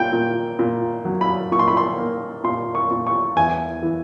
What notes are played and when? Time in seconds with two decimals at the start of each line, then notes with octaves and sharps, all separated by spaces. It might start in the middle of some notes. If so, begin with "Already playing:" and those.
Already playing: A#2 G5
0.13 A#2
0.59 A#2
1.05 F#3
1.21 B5
1.52 A#2 C#6
1.59 C6
1.68 B5
1.77 C6
1.98 A#3
2.44 A#2 C6
2.75 C#6
2.91 A#2
3.07 C#6
3.36 E2 G#5
3.82 E3